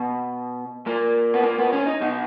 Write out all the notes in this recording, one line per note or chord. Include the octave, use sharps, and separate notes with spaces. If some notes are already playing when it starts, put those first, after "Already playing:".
Already playing: B2
A#2 A#3
B3
A#3
B3
C#4
D#4
B2 D#4